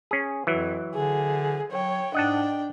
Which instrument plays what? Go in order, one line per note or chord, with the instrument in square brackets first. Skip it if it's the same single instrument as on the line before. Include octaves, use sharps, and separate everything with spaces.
[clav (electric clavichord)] C#4 G#4
[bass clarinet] F2 [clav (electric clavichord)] E3 F#3
[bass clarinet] D3 [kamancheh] G#4
[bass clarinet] F#3 [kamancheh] C#5 G5
[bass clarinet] G#2 [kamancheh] D4 G5 [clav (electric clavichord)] D#5 F#5 A5